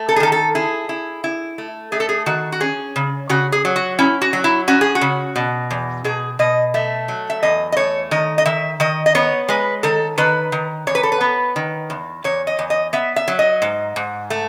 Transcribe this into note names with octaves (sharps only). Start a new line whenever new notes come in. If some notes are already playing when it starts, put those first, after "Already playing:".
Already playing: A3
A4
G#4
D#3 A4
A4
E4 G#4
E4
E4
A3
A3 G#4
A4
G#4
D#3 F#4
F#4
C#4 G#4
C#3
C#3 F#4
G#4
F#3
F#4
C#4 E4
F#4
F#3
E4
C#4 F#4
G#4
F#4
C#3
B2
E2
B2 G#4
B2 D#5
A3 E5
F#3
E5
E2 D#5
D#5
A3 C#5
D#3 D#5
D#5
D#3 E5
D#3 D#5
D#5
B3 C#5
G#3 B4
D#3 A4
D#3 B4
D#3
E2 C#5
B4
A4
B4
B3
D#3
E2
E2 C#5
D#5
E2
D#5
B3 E5
E5
F#3
D#5
G#2
G#2
A3